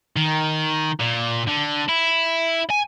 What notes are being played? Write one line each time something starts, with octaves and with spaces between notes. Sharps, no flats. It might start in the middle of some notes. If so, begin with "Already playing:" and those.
D#3
A#2
D3
E4
G#5